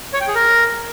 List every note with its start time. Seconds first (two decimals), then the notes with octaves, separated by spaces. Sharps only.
0.13 C#5
0.21 G5
0.28 G#4
0.35 A#4